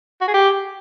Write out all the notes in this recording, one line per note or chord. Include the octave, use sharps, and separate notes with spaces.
F#4
G#4
G4